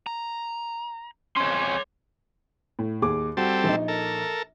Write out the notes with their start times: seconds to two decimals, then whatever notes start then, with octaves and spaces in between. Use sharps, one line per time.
0.06 A#5
1.36 F2 C#4 C#5 C6
2.79 A2
3.02 D#2 G#4 D6
3.37 G3 C4 F#4 A4
3.64 A#1 D#4
3.88 A4 A#4